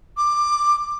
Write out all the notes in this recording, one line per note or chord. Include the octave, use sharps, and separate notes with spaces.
D6